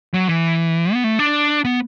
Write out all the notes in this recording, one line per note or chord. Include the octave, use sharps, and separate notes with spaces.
F#3
E3
B3
A3
D4
B3